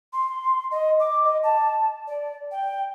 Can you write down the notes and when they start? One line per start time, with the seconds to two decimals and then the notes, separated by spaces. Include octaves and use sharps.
0.13 C6
0.71 D#5
0.99 D6
1.24 D#5
1.43 A5
2.07 D5
2.51 G5